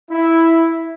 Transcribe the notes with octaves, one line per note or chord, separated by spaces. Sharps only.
E4